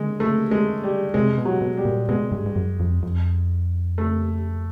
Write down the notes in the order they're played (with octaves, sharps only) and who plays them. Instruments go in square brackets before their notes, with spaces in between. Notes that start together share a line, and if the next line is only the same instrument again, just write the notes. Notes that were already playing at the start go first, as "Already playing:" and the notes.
Already playing: [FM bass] D3 [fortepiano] G#3
[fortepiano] A3
G#3
G3
[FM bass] C3 [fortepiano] G#3
[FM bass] B2
[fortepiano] F#3
[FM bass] B2
[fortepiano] G3
[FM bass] A#2
[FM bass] B2 [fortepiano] G#3
[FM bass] G2
G2
F#2
F2
F2
[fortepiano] A3